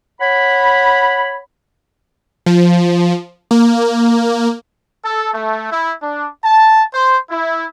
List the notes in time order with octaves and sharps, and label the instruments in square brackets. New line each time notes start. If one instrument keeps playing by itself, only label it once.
[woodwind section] C#5 F#5 B5
[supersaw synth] F3
A#3
[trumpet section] A4
A3
E4
D4
A5
C5
E4